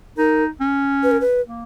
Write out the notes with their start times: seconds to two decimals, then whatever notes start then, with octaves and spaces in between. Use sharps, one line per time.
0.18 D#4 A#4
0.60 C#4
1.03 B4
1.11 A#4
1.21 B4
1.46 A#3